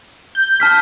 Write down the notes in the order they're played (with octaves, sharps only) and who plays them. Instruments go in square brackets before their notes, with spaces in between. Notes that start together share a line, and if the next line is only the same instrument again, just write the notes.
[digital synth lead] G6
[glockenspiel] A5 F6 B6